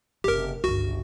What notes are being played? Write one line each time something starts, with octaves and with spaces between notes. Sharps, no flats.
F#1 C3 G4 A#4
G1 C#2 F#4